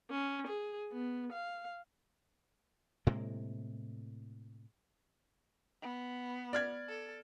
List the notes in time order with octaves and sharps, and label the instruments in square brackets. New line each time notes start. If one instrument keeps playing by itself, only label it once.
[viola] C#4
G#4
B3
F5
[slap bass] A2 C3 G#3 A#3
[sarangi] B3
[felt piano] D5 F6 G#6
[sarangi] A4